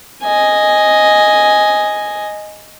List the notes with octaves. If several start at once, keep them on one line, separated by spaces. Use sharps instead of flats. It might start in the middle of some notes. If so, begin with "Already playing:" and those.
D#5 G#5